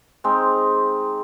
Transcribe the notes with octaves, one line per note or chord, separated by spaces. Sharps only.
G#3 C4 D#4